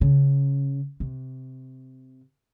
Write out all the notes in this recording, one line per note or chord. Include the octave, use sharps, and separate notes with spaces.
C#3
C3